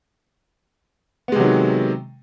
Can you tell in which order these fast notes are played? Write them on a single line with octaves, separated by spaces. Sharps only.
B3 G#3 C3 F#3 D#3